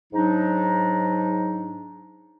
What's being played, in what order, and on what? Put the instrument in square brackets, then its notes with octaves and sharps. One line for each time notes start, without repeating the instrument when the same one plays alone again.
[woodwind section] G#2 F#3 D4 D#4